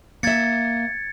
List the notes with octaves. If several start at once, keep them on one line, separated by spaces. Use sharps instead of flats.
A#3 E5 G#6 A6 C#7